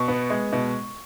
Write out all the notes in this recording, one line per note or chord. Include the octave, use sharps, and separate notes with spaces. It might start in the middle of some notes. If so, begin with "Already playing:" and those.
Already playing: B2 C#6
B3
G#3
B2